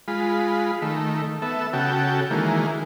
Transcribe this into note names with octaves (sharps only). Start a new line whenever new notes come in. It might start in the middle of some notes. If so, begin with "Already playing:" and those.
G#3 F4 B5
D#3 A3
B3 A4 E5
C#3 F#4 A4 G5
D#3 E3 G#3 A#3